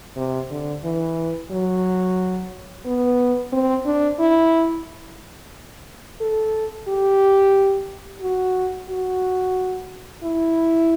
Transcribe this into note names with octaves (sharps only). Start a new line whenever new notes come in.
C3
D3
E3
F#3
B3
C4
D4
E4
A4
G4
F#4
F#4
E4